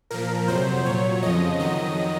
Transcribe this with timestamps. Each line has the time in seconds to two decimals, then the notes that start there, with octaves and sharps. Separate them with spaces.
0.11 A#2 F3 A#4
0.48 F2 C3 F#3 C5
0.85 A#2 F#3 C#5
1.23 F2 C#3 F3 D#5
1.59 F2 D#3 F#3 D#5